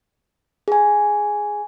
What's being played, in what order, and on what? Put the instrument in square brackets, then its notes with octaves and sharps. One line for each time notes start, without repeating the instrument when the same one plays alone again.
[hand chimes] G#4 G#5